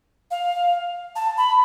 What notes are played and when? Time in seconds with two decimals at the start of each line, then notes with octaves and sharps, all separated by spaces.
0.31 F5
1.16 A5
1.37 B5